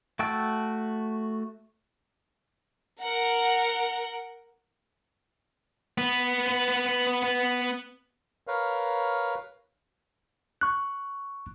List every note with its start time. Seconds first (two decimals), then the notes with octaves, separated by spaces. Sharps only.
0.19 A3 F#4 G5 A5 E6
3.01 A#4 F#5
5.98 B3 B4
8.47 A#4 B4 C#5 F5
10.61 C#6 F#6